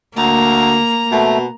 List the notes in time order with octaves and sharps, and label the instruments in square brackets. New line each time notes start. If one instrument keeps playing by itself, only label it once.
[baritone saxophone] D2 [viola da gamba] A#3 [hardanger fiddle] A#5
[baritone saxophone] B2 [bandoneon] A3